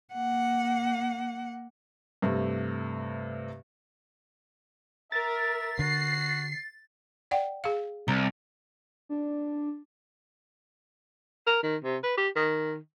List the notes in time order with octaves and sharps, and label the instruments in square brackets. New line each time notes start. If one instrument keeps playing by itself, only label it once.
[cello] A#3 F#5
[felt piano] G2 C3 A3
[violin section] A#4 [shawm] E5 [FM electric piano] A6
[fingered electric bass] D3 [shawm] F#4 [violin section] C7
[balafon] D5 F#5 G5
G#4 F5
[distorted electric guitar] C2 [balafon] A#5
[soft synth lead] D4
[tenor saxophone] A#4
D#3
C3
B4
G4
D#3